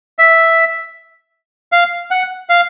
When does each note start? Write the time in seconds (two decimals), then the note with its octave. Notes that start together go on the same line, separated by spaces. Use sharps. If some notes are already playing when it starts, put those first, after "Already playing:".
0.19 E5
1.72 F5
2.11 F#5
2.49 F5